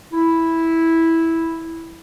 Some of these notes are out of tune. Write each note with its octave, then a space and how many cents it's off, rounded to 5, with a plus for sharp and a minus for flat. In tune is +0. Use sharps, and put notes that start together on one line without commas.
E4 -5